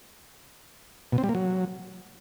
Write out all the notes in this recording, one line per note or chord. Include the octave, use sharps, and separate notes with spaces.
B2
C4
G3
A#3
F#3